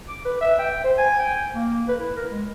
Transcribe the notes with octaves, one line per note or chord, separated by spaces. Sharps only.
D6
B4
E5
G5
C5
G#5
G5
A#3
B4
E4
A#4
G#3